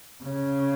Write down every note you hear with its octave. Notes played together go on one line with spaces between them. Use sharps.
C#3